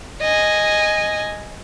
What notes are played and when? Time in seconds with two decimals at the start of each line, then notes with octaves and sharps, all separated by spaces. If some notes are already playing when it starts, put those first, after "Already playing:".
0.22 D#5 G#5